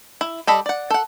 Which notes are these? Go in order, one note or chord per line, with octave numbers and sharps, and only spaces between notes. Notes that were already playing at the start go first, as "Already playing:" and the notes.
E4
G3 A4 D#5 B5
D5 F#5
A4 F#5